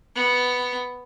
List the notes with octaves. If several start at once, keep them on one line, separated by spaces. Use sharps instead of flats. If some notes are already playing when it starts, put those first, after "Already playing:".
B3